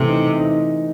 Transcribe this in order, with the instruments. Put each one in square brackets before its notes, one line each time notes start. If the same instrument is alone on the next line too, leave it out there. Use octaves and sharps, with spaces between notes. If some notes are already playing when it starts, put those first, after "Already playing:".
Already playing: [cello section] C3 [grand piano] E3 A3
[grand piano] D#4
D#4